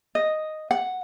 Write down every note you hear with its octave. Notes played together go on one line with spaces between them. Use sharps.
D#5
F#5